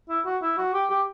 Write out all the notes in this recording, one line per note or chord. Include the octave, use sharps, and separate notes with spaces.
E4
F#4
E4
F#4
G4
G4